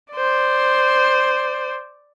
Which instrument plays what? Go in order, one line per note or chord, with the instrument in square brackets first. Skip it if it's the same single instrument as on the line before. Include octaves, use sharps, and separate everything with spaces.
[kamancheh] C5 D5